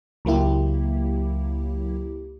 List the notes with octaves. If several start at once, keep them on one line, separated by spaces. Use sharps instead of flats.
C#2 F#3 A#3 E4 G4